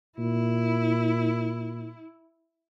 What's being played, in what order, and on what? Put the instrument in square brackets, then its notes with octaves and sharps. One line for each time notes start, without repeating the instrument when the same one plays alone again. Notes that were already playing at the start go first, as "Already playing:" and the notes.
[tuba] A#2 [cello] E4